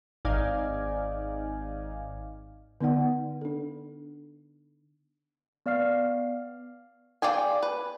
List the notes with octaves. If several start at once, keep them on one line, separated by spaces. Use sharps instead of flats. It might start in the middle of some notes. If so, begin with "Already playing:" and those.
G#1 D#4 D5 F5 G#5
D3 B3 D#4 D5 F#5
D4 A4
B3 D5 F5 F6 C7
G#4 D5 F5 G5 G#5
B4